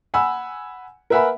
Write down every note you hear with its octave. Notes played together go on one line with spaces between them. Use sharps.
F#5 G#5 B5 E6
A#4 B4 E5 F#5 G#5 B5